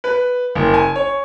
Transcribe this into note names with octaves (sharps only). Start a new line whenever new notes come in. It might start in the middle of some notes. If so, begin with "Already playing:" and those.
B4
F#1
G#5
C#5